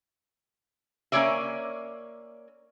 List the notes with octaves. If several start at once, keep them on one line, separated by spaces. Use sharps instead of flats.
A#3 C#4 F#4 C#5 D5 E5